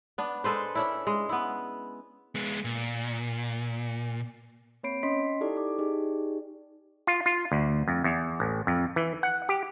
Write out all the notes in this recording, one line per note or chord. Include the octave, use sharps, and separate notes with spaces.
B3 D4
G#3 A4 B4 C5
C#4 D4 E4
G#3
B3 E4
G#3 B3
A#2
A#3 C4 C#5 B5 C7 D7
C#4 D#5 C6 B6
D#4 E4 G4 A4 D5
D6
D#4 G4 G#4 D5
F4
F4
D2
F2
E2
A1
F2
E3
F#5
G4